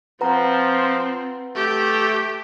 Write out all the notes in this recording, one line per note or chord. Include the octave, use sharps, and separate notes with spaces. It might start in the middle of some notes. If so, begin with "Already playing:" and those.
F3 C4 B4 F#5 A#5
A3 G4